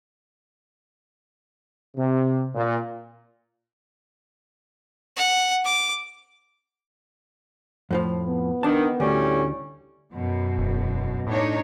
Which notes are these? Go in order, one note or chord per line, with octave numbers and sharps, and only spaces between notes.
C3
A#2
F#5
D6
F2 A2 F3
B3
D#3 D4 A5
D2 A2 G3 C#4
F#2 B2
E1
A2 D4 D#4 C#5